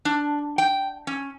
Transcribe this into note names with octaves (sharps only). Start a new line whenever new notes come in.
D4
G5
C#4